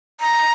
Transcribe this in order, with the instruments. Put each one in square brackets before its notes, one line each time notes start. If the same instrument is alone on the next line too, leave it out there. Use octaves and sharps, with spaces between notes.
[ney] A#5